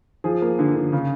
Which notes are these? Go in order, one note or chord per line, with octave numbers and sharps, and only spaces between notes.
F3 G#4
A#3
D3
D3
C#3